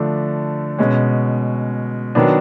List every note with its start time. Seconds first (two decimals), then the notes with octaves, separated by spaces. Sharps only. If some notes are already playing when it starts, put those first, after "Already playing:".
Already playing: D3 F3 A3 D4
0.79 B2 G#3 C#4
2.15 D#3 F#3 B3 D4